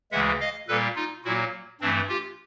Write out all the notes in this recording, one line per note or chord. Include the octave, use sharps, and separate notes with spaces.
D2 C#3 E3 G#3 E5 F#5
D#5 F5
A#2 G3 A#3 A4 B4
D#4 F4
A#2 F#3 A#3 E4 F#4
G2 E3 A3 C4 D4
F4 G4